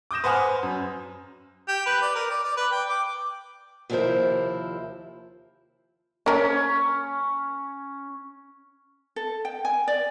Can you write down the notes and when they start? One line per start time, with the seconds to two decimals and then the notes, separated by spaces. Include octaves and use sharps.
0.11 D6 D#6 G6 A#6 E7
0.24 B4 C5 F#5 G#5 D#6 F6
0.63 F#2
1.68 G4
1.86 B4
2.02 D5
2.15 A#4
2.30 D5
2.43 D5
2.57 B4
2.72 G5
2.89 D6
3.90 D#2 C3 F3 E4 A#4 C5
6.26 A#3 C#4 A#4
9.16 A4
9.45 G5
9.65 G#5
9.88 D5